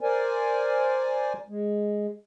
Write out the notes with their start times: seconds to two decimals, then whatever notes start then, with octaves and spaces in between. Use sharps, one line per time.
0.01 A#4 C5 D5 G#5
1.49 G#3